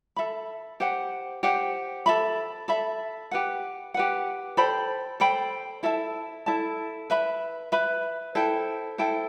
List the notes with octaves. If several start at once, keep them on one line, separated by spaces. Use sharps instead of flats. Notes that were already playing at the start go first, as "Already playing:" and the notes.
A4 E5 B5
G4 C5 F#5
G4 C5 F#5
A4 E5 B5
A4 E5 B5
G4 B4 F#5
G4 B4 F#5
A4 C5 G5 B5
A4 C5 G5 B5
E4 A4 E5 A5
E4 A4 E5 A5
B4 E5 B5
B4 E5 B5
E4 A4 C5 G5
E4 A4 C5 G5